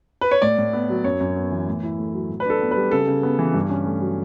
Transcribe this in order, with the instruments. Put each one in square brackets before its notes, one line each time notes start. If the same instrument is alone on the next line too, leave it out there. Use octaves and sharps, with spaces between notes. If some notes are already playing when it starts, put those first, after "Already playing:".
[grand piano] B4
C#5
A2 D5
A2
B3
F#3
F#2 C#5
F#2
B3
E3
A2
E4
A3
F#3
A2
B4
D4 A4
B3
B4
G3
C#3 A4
C#3
B3
E3
G2
C#4
A3
F#3